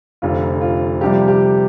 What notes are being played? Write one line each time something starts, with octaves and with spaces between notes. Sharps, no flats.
F1 F2 D3 F3 F4
F4
F2 C3 G3 G4
G4